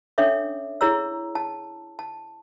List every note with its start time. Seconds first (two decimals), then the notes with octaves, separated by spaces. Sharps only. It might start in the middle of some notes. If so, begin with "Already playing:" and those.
0.18 C#4 D4 A4 C#5 E5 D6
0.81 E4 G#4 C#5 A#5 E6
1.35 A5
1.99 A5